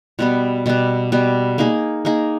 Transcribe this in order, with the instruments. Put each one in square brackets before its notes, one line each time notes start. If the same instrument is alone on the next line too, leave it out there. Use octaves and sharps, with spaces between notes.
[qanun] B2 G3 B3
B2 G3 B3
B2 G3 B3
A#3 D#4 G#4
A#3 D#4 G#4